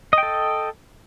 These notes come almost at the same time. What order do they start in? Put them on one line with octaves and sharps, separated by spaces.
D#5 G5 A4